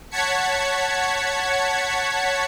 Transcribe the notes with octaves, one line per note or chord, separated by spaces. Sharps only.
C#5 F#5 A5 G#6 B6 C#7